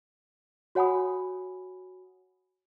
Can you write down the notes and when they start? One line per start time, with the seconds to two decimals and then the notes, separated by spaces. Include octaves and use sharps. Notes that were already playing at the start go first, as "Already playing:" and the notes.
0.75 F#4 C#5 F#5 G#5 B5 D#6